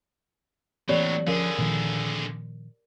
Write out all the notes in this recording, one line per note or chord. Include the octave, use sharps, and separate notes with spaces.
A2 E3 F#3 A#3 C4 G4 C#5 D5
D3 F3 C#4 G#4 A#4 F5
A#2 D#3 F3